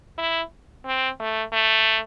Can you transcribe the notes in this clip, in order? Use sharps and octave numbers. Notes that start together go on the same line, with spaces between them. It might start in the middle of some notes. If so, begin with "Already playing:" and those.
E4
C4
A3
A3